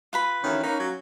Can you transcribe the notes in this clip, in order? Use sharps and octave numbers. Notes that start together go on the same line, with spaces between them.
F4 B4 B5
D2 D#3 E3 C#4
A#3 C#4 D#4
F#3